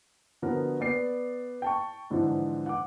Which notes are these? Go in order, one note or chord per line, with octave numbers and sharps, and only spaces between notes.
D3 F3 B3 F#4 A#4
B3 D5 C7
G5 A5 C#6
G#2 D3 E3 F3
F#5 D6